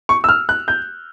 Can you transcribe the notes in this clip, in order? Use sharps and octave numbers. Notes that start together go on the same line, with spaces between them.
C#6
E6
F6
F#6
G6